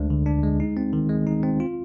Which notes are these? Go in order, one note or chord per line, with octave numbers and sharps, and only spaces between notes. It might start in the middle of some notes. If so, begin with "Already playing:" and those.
Already playing: D2 G#3 D4
D3
D4
G#3
D#4
C4
D#3
G#3
D#4
C4
F4